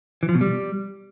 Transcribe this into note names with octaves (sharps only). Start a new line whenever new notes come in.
E3
F3
B2
G3